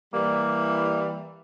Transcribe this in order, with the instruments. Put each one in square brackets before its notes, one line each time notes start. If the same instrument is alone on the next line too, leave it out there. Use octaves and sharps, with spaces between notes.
[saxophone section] E3 G3 [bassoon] A#3